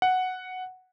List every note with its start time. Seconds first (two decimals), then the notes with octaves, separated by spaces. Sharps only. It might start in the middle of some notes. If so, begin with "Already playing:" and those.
0.02 F#5